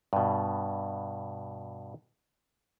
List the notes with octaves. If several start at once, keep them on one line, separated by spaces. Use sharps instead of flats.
G2 B2